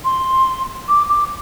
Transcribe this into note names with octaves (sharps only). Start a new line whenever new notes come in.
C6
D6
D6